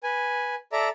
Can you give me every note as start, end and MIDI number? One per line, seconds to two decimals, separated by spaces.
0.03 0.55 71
0.03 0.55 80
0.72 0.89 69
0.72 0.89 74
0.72 0.89 76
0.72 0.89 82